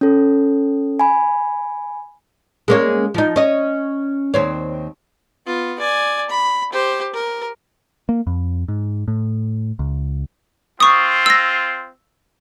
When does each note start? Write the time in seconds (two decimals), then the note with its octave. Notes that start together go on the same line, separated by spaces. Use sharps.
0.01 C#4 A4
1.00 G#5 B5
2.68 G#3 A#3 C#4
3.14 F3 D#4
3.36 C#4 D#5
4.34 D#2 C4 C#5
5.46 B3 F4
5.79 D5 G#5
6.30 B5
6.73 G4 C5
7.14 A#4
8.09 A#3
8.27 F2
8.68 G#2
9.08 A2
9.79 C#2
10.80 C4 F4 C#6 D#6
11.26 E6 A#6